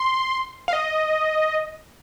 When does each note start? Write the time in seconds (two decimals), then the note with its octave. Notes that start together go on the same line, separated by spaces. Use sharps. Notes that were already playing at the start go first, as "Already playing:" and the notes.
Already playing: C6
0.68 F5
0.73 D#5